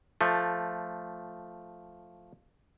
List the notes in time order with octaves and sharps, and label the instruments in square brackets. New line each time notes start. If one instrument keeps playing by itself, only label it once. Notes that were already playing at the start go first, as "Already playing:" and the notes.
[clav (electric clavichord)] F3 A3